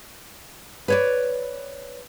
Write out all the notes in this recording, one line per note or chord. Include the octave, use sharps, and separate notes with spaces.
B4 C#5 D5